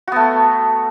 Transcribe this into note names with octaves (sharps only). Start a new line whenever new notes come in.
A3 B3 F#4